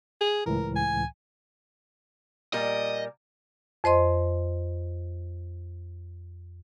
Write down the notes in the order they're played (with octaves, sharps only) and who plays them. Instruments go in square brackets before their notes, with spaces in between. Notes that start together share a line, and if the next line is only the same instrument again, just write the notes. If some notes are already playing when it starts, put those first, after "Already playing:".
[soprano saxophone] G#4
[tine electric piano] C#2 A2 E3 [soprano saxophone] A#4
[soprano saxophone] G#5
[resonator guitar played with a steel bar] A#2 G3 A#4 [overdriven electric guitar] D#5
[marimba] F2 C5 D#5 C6